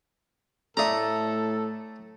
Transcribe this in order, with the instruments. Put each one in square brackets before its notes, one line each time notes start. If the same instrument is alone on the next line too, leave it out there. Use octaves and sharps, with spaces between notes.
[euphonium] A2 [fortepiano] A3 D5 E5 [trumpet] A4 [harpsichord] A#5 D#6